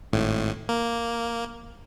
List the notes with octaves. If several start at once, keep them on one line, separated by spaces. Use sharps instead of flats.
G#1 A2
A#3